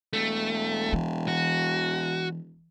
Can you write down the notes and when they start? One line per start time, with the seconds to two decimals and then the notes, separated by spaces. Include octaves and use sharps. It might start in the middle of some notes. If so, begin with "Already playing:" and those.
0.13 E1 A3
0.93 E3
1.28 F#4